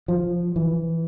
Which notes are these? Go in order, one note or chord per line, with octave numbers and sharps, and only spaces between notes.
F3
E3